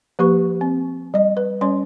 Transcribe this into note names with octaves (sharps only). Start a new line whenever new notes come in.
F3 A#3 G4 B4 C#6
C4
G3 D#5
B4
G3 C#4 C#5 C6